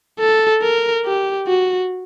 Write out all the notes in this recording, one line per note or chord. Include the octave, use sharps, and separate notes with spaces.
A4
A#4
G4
F#4